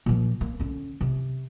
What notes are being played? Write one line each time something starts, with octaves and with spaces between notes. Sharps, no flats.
A#2 F3
A#3
D3 C#4
C3